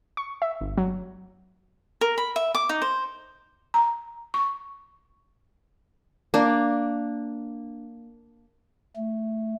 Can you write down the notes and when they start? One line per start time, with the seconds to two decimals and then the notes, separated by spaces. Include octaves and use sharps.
0.17 C#6
0.42 E5
0.61 G1
0.78 F#3
2.01 A#4
2.18 B5
2.36 E5
2.55 D6
2.69 D#4
2.82 C5
3.74 A#5
4.34 C#6
6.34 A#3 D4
8.96 A3